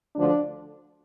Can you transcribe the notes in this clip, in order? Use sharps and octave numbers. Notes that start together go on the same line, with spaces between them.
D2 D3 F3 D4